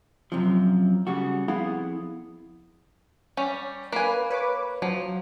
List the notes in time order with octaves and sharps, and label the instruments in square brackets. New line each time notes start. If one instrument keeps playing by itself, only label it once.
[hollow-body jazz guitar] F#2 C3 F3
C#3 G3 F#4
F2 B3 E4 G#4 F5 F#5
[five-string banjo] G3 C#4
[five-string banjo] A#3 G#5 [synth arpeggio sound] B4
[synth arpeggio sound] B4 C#5 D6
[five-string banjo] F3 [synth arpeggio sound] F#3